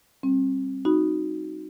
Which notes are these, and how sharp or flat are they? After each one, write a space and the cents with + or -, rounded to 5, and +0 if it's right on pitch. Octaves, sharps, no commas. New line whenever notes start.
G3 +0 C4 +40
D#4 +0 F#4 +0 B5 +0